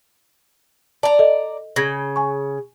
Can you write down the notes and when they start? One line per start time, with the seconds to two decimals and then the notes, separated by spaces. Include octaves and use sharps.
1.03 D5 A5 A#5
1.19 A4 D#5
1.76 C#3 G#6 A#6
2.16 G#5 C#6